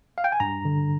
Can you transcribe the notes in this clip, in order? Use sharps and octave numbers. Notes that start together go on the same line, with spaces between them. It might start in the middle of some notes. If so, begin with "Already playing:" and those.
F5
G5
G#5
G2 A#5
D3